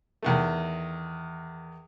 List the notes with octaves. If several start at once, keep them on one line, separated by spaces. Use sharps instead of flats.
E2 D#3 A3